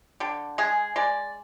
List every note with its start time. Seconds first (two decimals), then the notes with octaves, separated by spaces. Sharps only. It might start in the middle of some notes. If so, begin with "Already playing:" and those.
0.20 D3 G4
0.58 G#3 G#4
0.96 G#3 D5